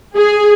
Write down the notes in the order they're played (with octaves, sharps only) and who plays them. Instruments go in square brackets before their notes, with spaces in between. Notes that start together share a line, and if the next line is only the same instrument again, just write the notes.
[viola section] G#4